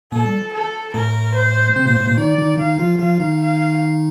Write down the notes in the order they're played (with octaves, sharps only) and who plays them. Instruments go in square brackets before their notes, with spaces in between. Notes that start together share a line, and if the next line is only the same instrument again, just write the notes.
[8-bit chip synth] A#2 A#3 [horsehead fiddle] A4
[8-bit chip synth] G3
[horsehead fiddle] A4
[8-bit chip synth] A2 A3 [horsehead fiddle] A#4
[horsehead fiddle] C5
[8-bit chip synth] C3 C4
A#2 A#3
A2 A3
A#2 A#3
[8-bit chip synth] D#3 D#4 [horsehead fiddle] D5
[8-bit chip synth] D#3 D#4
[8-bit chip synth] D#3 D#4 [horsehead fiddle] F5
[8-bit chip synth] F3 F4
[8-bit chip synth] F3 F4 [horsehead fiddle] F5
[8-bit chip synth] D#3 D#4
[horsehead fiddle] F5